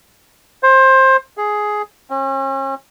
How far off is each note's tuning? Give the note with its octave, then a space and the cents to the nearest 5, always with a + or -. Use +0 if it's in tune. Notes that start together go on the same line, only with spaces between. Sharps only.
C5 +20
G#4 +10
C#4 -40